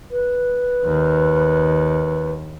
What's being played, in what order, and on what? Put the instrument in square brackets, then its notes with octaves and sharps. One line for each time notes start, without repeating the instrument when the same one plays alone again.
[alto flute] B4
[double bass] D#2